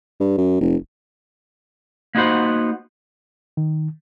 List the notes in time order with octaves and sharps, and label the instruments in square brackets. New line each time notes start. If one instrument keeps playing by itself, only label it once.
[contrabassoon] G2
F#2
F1
[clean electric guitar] A#3 B3 D#4 F#4 C5 F#5
[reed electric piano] D#3